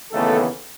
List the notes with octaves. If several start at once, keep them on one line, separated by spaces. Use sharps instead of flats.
D#2 C#3 E3 A3 B3 A4